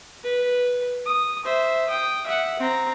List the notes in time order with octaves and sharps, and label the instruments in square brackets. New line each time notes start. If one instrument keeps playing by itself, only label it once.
[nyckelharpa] B4
D#6
C5 E5
G5 D#6
E5 F#5
C4 A#5